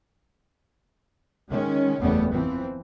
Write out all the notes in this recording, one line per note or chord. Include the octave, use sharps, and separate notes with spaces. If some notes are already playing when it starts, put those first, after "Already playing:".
D#3 G#3 C#4
F#1 E2 G3 A3 B3 C#4
E3 F3 C4